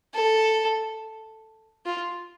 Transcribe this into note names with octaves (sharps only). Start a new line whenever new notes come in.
A4
F4